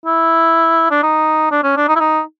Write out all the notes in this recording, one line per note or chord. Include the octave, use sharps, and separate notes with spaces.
E4
D4
D#4
D4
C#4
D4
D#4
E4
D#4